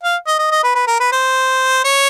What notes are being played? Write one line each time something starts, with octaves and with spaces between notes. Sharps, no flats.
F5
D#5
D#5
D#5
B4
B4
A#4
B4
C5
C#5